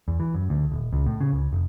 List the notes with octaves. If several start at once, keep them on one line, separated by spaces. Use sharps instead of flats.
E2
E3
F#2
D2
D#1
C#2
A2
C#3
C#2
F1